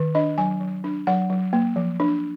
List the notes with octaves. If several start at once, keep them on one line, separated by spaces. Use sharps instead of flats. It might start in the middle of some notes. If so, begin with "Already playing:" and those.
Already playing: D#3
D4 D#5
F#3 G#5
F#3
D4
F#3 F#5
F#3
A#3
F3
D4